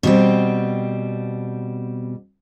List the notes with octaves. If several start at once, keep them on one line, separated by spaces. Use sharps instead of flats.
B2 G3 C4